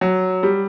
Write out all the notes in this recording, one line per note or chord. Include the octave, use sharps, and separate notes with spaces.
F#3
G3